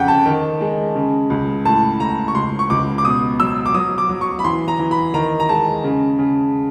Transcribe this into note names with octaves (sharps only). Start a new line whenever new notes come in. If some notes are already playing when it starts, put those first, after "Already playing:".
Already playing: F2 C#3 F#5 G5
A5
D#3
G#3
C#3
C#2
A2 A5
A2 A#5
C#6
C#2 C6
C#6
C#2 D6
D6
B2 D#6
F#3 E6
D6
F#3 D#6
D6
F#3
C#6
B5
E3 C6
A#5
E3
B5
D#3 A#5
A#5
G#3 A5
C#3
C#3